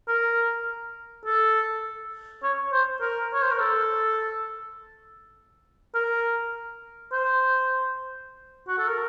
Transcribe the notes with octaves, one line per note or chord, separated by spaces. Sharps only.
A#4
A4
C#5
C5
A#4
C#5
C5
A#4
A4
A#4
C5
F#4
A4
A#4